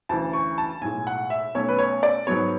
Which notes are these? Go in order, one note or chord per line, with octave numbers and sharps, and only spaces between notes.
D2 C#3 E3 A5
C#6
A5
B1 A2 G#3 G#5
F#5
E5
B1 B2 A3 C#4 C#5
B4
C#5
D5
G#2 F#3 B3 C#5